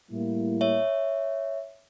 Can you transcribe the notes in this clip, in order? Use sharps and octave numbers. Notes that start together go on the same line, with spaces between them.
A2 G3 A#3 E4
C#5 E5